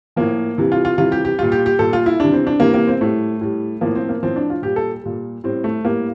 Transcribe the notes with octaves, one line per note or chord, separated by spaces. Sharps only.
A2 F3 A#3
C3 E3 G3
F4
F4
C3 E3 G3 F4
G4
G4
A#2 G3 F4
G4
G4
A#2 G3 A4
F4
E4
C3 E3 G3 D4
C4
D4
C3 E3 G3 A#3
A#3
C4
A2 G3 A3
A2 G3
A2 F3 A#3
C4
A#3
A2 F3 C4
D4
F4
A#2 G3 G4
A4
A#2 G3
A2 G3 C4
A3
A2 G3 A#3